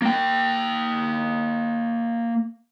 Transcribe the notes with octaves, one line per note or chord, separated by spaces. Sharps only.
A#3 G5